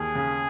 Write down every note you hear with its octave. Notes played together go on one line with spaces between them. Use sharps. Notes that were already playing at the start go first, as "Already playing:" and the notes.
Already playing: D#2 G#4
C#3